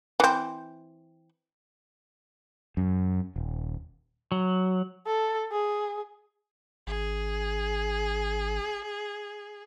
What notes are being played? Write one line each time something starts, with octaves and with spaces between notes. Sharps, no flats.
E3 C4
F#2
D#1
F#3
A4
G#4
G#1 G#4